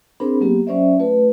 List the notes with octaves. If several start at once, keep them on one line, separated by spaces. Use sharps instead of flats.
C4 D4 G#4 A#4 C5 B5
F#3 A#3 B3 G4
F#3 C#4 C5 D5 E5
A3 F4 B4